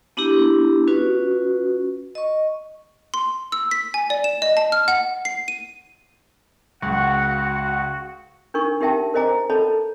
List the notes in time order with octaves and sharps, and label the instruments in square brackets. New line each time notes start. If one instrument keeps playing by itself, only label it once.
[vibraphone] B3 D4 E4 G4
C#4 F4 F#4 B4
D#5 C#6
[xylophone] C6
E6
B6
G#5
D5
E7
D#5
A5
F6
F#5
C7
D#7
[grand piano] C#2 C#3 [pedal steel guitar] F#4 [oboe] F#5
[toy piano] D4 D#4 A#4 C#6
D#4 G4 A#4 E5 G5 A5
A#4 C5 D#5 G#5 A#5 D6
A4 C#5 D#5 A5 B5